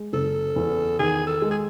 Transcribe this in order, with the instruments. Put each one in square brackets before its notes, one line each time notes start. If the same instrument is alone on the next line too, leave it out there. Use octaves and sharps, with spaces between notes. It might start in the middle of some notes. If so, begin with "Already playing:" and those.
Already playing: [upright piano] G#3
[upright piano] F#1 [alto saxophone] A4
[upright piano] E2
[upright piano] D#3 [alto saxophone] G#4
[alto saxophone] A4
[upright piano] G#3
[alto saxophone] G#4